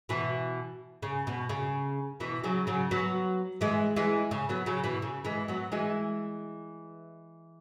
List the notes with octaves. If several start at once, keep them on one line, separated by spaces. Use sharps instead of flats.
B2 E3
C#3
B2
C#3
B2 E3
C#3 F#3
C#3 F#3
F#3 B3
E3 G#3
E3 G#3
C#3
F#3 B3
C#3 F#3
B2 E3
C#3
E3 G#3
F#3 B3
E3 G#3